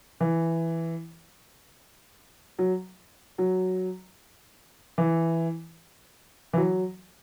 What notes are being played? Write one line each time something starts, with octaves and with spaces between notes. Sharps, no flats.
E3
F#3
F#3
E3
E3
F#3